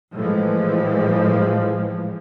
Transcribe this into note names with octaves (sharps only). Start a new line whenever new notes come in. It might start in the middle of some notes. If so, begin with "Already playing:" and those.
A2 E3 F3 G#3